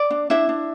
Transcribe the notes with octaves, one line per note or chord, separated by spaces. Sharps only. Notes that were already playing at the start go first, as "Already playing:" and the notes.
Already playing: D5
D4
D4 E4 E5
D4